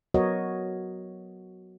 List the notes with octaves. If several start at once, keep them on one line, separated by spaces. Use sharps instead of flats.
F#3 B3 F#4 A#4 C#5 D#5